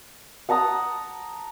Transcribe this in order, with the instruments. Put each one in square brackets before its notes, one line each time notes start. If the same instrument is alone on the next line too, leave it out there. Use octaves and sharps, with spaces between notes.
[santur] F#5 A5 A#5 D#6